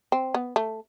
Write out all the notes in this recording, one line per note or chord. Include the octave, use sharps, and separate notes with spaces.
C4
B3
A3